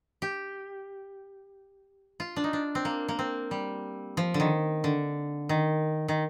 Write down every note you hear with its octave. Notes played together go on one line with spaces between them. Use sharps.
G4
F4
D4
D#4
D4
C4
A#3
A#3
C4
G3
F3
D3
D#3
D3
D#3
D#3